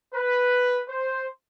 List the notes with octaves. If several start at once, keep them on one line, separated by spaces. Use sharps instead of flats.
B4
C5